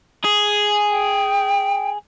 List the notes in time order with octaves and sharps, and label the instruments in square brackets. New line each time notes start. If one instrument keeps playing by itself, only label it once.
[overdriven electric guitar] G#4
[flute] G5